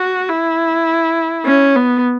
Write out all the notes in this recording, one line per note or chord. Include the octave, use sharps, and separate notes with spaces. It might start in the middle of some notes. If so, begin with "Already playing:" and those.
Already playing: F#4
E4
C#4
B3